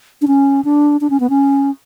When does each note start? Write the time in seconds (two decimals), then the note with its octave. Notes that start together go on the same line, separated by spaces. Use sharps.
0.22 D4
0.28 C#4
0.65 D4
1.01 D4
1.10 C#4
1.20 B3
1.30 C#4